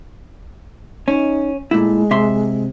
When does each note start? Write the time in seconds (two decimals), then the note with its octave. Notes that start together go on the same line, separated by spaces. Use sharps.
1.08 C#4 D#4
1.71 A#2 G#3 A3 E4
2.11 C3 E5 C6